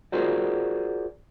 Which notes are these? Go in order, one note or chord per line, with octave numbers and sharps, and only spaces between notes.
F4 F#4 G#4 A#4 C5 D5